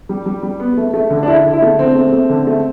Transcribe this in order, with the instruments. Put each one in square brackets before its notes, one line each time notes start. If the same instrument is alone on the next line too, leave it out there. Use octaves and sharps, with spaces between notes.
[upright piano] G3
G3
G3
B3
A3
A3
D3
D4
D3 E4
D3
E4
A3
D3 C4
A3
A3
D3
A3